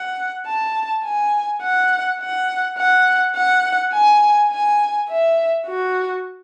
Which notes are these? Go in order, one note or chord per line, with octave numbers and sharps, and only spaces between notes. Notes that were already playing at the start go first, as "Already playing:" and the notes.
Already playing: F#5
A5
G#5
F#5
F#5
F#5
F#5
G#5
G#5
E5
F#4